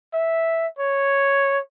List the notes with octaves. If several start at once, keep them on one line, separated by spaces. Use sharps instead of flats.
E5
C#5